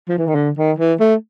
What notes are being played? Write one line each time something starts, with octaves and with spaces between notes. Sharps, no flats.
F3
E3
D#3
D3
D#3
E3
A3